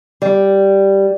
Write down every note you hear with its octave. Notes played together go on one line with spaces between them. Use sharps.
G3